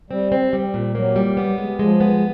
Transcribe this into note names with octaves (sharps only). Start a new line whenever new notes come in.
G3 C4
C4
G3
A#2
F#3 A#3
G3
B3
G#3
F3 G#3
B3